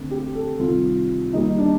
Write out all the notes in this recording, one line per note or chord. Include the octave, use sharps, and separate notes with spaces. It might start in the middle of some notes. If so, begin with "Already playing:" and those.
Already playing: D3 A3 C4
G4
A4
C3 D#3 G3 F4
D#3 G3 A#3 D#4
D4